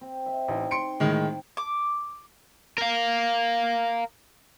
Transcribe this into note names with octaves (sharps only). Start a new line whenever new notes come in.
C4
D#5 E5
A1 D#4
C6 C#7 D7
A2 D#3 G#3
D6
A#4 F5